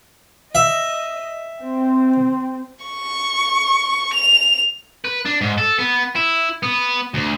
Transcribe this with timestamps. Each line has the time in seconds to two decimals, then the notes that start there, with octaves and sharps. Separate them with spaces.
0.55 D#5 E5
1.60 C4
2.84 C#6
4.14 F7
5.05 B4
5.26 D4
5.41 G#2
5.58 A4
5.79 B3
6.16 E4
6.63 B3
7.14 D2